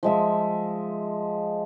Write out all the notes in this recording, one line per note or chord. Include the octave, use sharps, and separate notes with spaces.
F3 G#3 E5